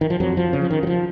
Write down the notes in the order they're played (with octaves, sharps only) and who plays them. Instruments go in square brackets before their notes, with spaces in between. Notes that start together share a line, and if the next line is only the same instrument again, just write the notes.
[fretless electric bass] D#3
F3
F2 F#3
F3
C#3
F3
D#3
F#3
F3